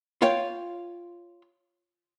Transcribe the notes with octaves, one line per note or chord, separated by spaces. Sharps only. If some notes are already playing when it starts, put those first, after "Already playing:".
F4 C#5 F5 G5